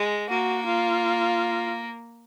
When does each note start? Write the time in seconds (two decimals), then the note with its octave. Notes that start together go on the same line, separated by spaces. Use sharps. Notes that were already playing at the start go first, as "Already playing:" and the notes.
Already playing: G#3
0.29 A#3 F#4
0.66 F4